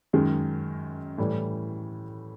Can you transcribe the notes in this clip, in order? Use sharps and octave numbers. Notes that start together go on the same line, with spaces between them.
F#2 D#3 G#3
A2 E3 G3